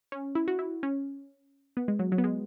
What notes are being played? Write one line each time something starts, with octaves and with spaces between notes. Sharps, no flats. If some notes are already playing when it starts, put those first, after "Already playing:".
C#4
E4
F#4
E4
C#4
B3
G#3
F#3
F#3
B3
G#3